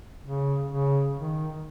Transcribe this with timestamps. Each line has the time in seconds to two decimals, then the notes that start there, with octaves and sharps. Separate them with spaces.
0.23 C#3
0.69 C#3
1.15 D#3